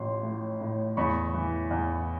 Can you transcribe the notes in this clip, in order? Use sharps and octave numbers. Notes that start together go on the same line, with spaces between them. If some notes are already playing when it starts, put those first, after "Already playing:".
Already playing: A1 F3 C6
A2
A2
E2 B5 C#6
E3
E2